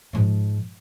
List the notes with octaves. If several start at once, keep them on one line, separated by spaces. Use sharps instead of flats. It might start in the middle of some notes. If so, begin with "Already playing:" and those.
G#2 F3